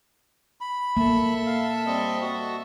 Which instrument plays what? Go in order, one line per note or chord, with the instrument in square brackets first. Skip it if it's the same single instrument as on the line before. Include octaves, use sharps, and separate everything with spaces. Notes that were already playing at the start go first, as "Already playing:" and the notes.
[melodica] B5
[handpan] A#3 [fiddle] A4 E5
[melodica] F5
G3 C4 D#5
F#4